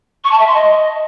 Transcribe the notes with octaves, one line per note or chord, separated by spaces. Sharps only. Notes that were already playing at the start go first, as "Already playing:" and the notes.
C#6
A5
E5
C6
D#5